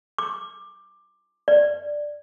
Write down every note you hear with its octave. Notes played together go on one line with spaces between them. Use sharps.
D6
D5